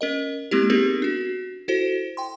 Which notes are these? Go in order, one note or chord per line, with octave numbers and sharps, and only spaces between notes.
C#4 A#4 D#5
G#3 A#3 C4 E4 G4
B3 C4 D#4 G4 G#4 A#4
D4 F#4
E4 F#4 A4 C5
G5 C6